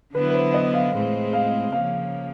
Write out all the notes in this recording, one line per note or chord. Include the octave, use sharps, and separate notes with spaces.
D3 F#3 B3 E4 B4
B4
C5
D#5
F5
A2 E3 G#3 C4
F5
C#3 F3 A#3 F5